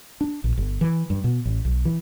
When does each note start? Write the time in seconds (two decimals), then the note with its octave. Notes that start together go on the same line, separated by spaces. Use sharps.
0.21 D4
0.44 A#1
0.58 G1
0.81 E3
1.10 G2
1.24 B2
1.46 A1
1.65 B1
1.85 E3